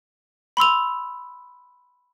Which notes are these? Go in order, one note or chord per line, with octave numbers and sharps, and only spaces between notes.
B5 C6 E6 F7